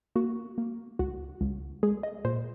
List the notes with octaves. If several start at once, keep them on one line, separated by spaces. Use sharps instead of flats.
A#3 F#4
A#3
C#2 F#4
C#2
G#3 G#4
D#5
A#2 C5